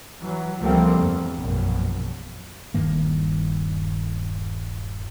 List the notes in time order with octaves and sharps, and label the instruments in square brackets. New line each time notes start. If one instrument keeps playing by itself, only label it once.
[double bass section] E3 F#3
C#2 F3 G3 A3 A#3 C4
E2 G2
A#1 F#2 B2
[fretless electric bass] D#1 G2 D#3 A#3